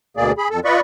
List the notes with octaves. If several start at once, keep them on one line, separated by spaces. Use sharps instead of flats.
D2 B2 A#3 G#4 D5
G#4 B5
F2 A4
F4 B4 D5 D#5 B5 C#6